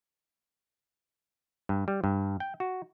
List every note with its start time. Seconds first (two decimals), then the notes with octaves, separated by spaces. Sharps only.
1.69 G2
1.88 G3
2.04 G2
2.40 G5
2.60 F#4